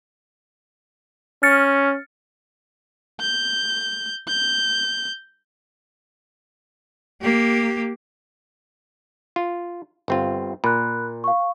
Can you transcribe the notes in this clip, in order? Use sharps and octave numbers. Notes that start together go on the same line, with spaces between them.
C#4 F6 A6 C#7
G6
G6
A#3 G4
F4
G1 C4 F4
A#2 B5 F#6
F5 C#6